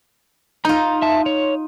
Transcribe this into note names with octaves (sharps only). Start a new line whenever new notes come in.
D#4 F4 A#5 G6
E5 A5
C#5